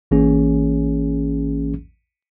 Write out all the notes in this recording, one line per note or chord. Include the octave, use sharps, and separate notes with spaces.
A1 E3 A#3 C#4 G#4